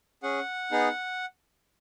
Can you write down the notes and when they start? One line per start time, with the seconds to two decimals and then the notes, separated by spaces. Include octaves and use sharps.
0.23 C#4 G#4 F#5
0.71 B3 D#4 G#4